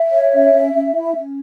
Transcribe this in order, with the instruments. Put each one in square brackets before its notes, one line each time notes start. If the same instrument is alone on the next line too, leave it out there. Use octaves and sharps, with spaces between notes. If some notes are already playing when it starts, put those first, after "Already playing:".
Already playing: [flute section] E5
C#5
C#4
C#4
C#4
E4
C#4